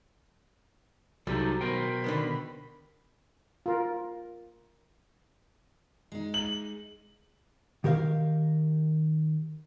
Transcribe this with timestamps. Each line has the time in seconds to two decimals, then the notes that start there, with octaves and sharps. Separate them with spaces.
1.27 C2 F#3 D#4 G4 A4
1.61 B2 A#4 C5 G5 B5
2.04 D3 D#3 B3
3.66 F4 A#4
6.12 G#3 D#4
6.34 F#7
7.84 D#3 G4 A#4 C5 F5